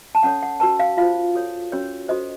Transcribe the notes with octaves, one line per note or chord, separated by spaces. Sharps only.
A5
C#4 A4 C#5 F#5
F#5
F#4 A#4 C#5 A5
F5
F4 C5 F5
F#4 A4 C#5
C#4 F#4 A#4 C#5
F#4 A4 C5 D#5